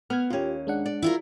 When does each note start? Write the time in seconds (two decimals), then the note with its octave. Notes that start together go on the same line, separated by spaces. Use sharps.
0.10 B3 F6 G#6
0.30 D#2 C#4 F4 G4
0.67 G#3 D4 F#5
0.86 D5
1.02 E4 F4 A#4